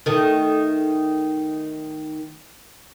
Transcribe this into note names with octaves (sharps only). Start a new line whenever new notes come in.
D#3 A3